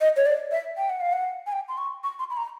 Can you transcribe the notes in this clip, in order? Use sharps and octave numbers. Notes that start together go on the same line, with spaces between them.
D#5
C#5
D5
E5
G5
F#5
F5
F#5
G#5
G5
C6
C#6
C#6
C6
B5
A#5